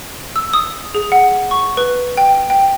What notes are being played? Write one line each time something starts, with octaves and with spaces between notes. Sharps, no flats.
E6
D#6
G#4
F#5
C#6
B4
G5
G5